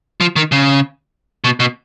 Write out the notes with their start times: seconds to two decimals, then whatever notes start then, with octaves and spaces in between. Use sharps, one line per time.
0.21 F3
0.36 D#3
0.52 C#3
1.44 B2
1.60 B2